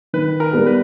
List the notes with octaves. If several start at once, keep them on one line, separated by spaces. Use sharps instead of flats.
D#3 B4
A#4
G3 B3
B4